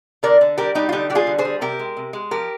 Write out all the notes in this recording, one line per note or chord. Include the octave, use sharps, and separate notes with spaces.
D3 A#4 D5
D3
G3 G4 A#4
G3 D#4 G4
F4
D3 D#4 G4
G3 G4
F4 G#4
D3
G#4 C5
G3
C3 G4 A#4
G#3
C3
G#3
F3 G4 A#4